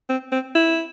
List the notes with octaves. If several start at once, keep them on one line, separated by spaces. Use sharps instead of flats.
C4
C4
E4